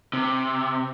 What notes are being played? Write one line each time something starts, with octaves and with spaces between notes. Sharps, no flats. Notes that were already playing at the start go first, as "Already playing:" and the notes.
C3